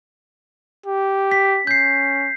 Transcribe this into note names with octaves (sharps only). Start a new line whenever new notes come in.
G4
B6
C#4 G6 C7